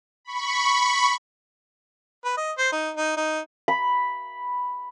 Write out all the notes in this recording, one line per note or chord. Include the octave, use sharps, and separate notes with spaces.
B5 C#6
B4
D#5
C5
D#4
D#4
D#4
B5